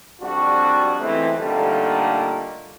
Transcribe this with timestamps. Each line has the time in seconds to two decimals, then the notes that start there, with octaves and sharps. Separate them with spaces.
0.22 F2 C3 G3 D4 F#4
1.00 C#2 E3 A3 C4
1.39 A#2 D3 G3 A3 A#3 D#4